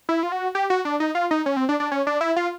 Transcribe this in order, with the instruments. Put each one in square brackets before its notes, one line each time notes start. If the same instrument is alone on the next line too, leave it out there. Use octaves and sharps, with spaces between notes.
[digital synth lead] E4
F4
F#4
G4
F#4
D4
D#4
F4
D#4
C#4
C4
D4
D4
C#4
D4
E4
F4